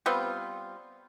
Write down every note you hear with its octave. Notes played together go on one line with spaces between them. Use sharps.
G3 B3 C4 F4